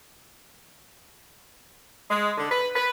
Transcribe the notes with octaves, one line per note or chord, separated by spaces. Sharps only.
G#3
D3
B4
B4